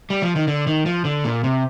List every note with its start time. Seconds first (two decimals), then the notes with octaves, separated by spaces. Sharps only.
0.10 G3
0.22 F3
0.36 D#3
0.48 D3
0.67 D#3
0.86 F3
1.05 D3
1.25 A#2
1.44 C3